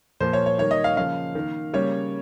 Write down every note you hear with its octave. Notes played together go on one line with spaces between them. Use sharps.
A#2 F3 A#3 C5
C#5
C#5
D#3 G3 A#3 C#5
D#5
F5
C#3 F3 A#3 F5
D#3 A#3
C#3 G3 A#3 C#5